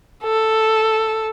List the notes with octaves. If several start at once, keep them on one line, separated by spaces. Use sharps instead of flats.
A4